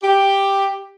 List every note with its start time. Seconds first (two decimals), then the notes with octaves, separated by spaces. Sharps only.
0.03 G4